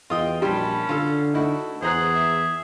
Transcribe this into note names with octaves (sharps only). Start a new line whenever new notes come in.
E2 F4 D#5 G5 D#6
A#1 G3 C#4 G5 A5 B5 C6
D3 F4 A4
A3 D#4 E4 F#4 A4
E2 G#4 C5 F#5 A#5 F#6
E5